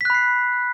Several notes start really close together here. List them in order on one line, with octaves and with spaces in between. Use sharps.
B6 F#6 B5 C7